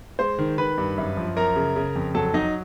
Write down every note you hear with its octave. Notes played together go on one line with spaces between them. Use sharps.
G#3 C5 C6
D#3
D#3 B4 B5
G2
F#2
F3
F#2 A#4 A#5
C#3
C#3
F2
F#3 A4 A5
F#3 D#4 D#5